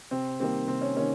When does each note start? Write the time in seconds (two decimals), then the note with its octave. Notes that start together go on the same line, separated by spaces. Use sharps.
0.11 C3 C4
0.40 D#3 G3 A#3 C4
0.68 C3 C4
0.81 C#4
0.96 D#3 G3 A#3 C#4